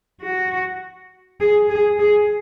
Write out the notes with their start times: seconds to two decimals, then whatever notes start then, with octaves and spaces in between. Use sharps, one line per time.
0.21 F#4
1.40 G#4
1.70 G#4
1.99 G#4